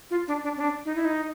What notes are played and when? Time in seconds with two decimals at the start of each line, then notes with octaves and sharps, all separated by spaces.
0.11 F4
0.28 D4
0.44 D4
0.57 C#4
0.60 D4
0.85 D#4
0.95 E4
1.05 D#4